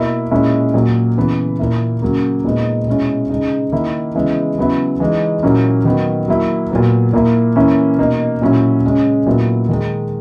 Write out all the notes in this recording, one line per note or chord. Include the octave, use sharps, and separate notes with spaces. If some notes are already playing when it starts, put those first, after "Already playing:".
Already playing: B2 A#3 E4
A#2 G#3 C#4 E4
A#2 F#3 A#3
C#3 E3 B3
A#2 A#3 E4
C#3 F#3 A#3
A#2 G#3 B3 D#4
B2 G#3 C#4 E4
C#3 G#3 D#4
D#3 A#3 E4
C#3 E3 G#3 B3 E4
C#3 F#3 B3 E4
E3 G#3 D#4
A#2 F#3 A#3 C#4 E4
D#3 F#3 B3
F#3 A#3 E4
A#2 F#3 B3
A#2 A#3 E4
E3 A#3 C#4 E4
B2 A#3 D#4
A#2 F#3 C#4 E4
C#3 G#3 C#4
A#2 F#3 B3 E4
D#3 G#3 D#4